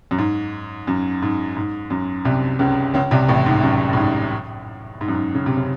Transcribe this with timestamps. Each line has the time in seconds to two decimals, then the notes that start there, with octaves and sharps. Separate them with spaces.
0.11 F#2
0.18 G#2
0.87 F#2
1.22 G#2
1.57 G#2
1.90 F#2
2.25 C2 C3
2.59 C#2 C#3
2.94 C#2 C#3
3.11 C2 C3
3.29 A1 A2
3.46 G#2
3.63 F#2
3.93 A2
3.97 G#2
5.01 G#2
5.08 F#2
5.15 G#2
5.35 C#3
5.46 C3
5.57 C#3